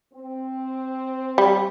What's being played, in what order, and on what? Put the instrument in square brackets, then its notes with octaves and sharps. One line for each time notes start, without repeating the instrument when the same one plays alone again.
[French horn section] C4
[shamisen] G3